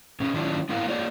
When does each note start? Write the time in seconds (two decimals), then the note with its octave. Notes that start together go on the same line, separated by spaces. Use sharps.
0.20 B2 C#4
0.34 D#3 F#3 C#4 D4 E4 F4
0.69 B3 C4 E4 A#4 F5
0.87 A#3 F4 G#4 C#5 D5